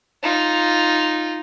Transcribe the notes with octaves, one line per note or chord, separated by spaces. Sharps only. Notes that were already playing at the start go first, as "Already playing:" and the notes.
D#4 F4